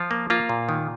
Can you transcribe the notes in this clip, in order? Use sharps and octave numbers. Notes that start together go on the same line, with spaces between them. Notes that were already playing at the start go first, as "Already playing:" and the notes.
Already playing: F3 F4
A#3
A#3 F4
A#2
D#3